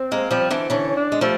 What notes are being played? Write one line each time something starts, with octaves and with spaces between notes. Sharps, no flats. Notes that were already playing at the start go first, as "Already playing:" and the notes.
Already playing: C4
G#3 A#3
F3 G3
D3 E3
D3 E3 C#4
C#4
D4
G#3
F3 G3 A3